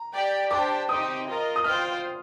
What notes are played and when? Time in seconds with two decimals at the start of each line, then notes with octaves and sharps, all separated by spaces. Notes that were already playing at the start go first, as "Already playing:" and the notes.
Already playing: A#5
0.13 G4 D5 G5
0.51 D4 G4 C5 G5 D6
0.89 C4 D#4 G4 C5 G5 D#6
1.28 F4 A#4 D#5
1.56 D#6
1.64 F4 C5 G5 F6